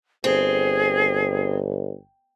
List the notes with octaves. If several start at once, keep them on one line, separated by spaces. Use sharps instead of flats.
G1 C4 G#4